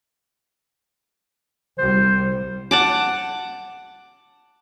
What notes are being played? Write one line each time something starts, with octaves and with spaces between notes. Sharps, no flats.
C2 G3 C5
F#5 A5 D6